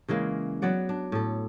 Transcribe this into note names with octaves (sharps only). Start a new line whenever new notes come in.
C#3 E3 G#3 A#3
F#3 B3 D5 F#5
D4
A2 A4